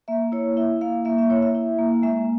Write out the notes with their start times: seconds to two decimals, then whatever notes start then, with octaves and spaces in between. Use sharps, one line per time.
0.08 A#3 E5
0.32 E4 C#5
0.57 E4 E5
0.81 A#3 F5
1.05 A#3 E5
1.18 E5
1.30 E4 C#5
1.42 E5
1.55 E4
1.79 A#3
2.03 G#3 E5